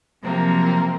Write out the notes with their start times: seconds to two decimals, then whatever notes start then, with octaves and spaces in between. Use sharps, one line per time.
0.22 C3 F3 F#3 A#3 C4 A#4